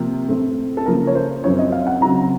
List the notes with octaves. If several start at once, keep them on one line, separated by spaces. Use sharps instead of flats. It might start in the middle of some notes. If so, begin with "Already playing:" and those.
Already playing: C3 F3 A#3
A2 A3 C4
A4
C#3 F3 A#3 A#4
C#5
C5
F#2 F3 C4 C#5
D#5
F5
F#5
C#3 F#3 C4 A#5